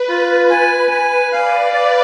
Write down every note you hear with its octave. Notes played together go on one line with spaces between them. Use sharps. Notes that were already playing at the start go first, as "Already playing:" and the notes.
Already playing: B4
F4
G#5
G#5
D5 F5
B4 D5